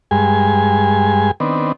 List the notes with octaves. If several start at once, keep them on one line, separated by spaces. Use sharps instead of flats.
G2 G#3 G#5
D#3 B3 C4 D4